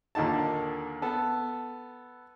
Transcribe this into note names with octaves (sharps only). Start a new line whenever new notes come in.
D#2 A#2 D3 D#4 A5
B3 A4